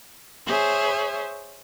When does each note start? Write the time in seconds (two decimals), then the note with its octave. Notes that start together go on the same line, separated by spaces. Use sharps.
0.46 G#4 C5 C#5 E5